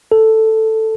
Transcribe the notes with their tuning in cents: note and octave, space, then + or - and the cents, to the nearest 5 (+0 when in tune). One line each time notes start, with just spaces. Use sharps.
A4 +5